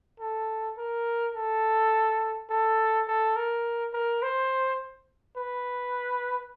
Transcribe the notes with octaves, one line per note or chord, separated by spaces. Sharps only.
A4
A#4
A4
A4
A4
A#4
A#4
C5
B4